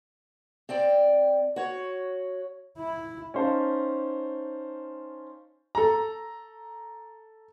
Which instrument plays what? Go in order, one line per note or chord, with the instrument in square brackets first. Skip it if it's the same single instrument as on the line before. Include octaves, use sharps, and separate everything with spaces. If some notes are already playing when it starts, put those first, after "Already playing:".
[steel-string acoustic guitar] C4 D5 G5
F#4 C#5
[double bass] E4
[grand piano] C#4 D#4 C5 F5 A5
[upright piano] A4 A#5